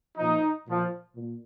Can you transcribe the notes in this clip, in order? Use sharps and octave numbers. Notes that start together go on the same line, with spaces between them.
A#2 F3 D#4
A#2 F3
A#2